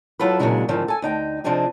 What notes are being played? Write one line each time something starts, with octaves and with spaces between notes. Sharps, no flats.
F#3 E4 F4 A4 B4
A#2 C#3 E3 F#3 G#3 D4
G#2 D3 D#3 F3 C4
A4 G#5
D2 D#4 G5
C3 F3 C4 D4 D#4 G#4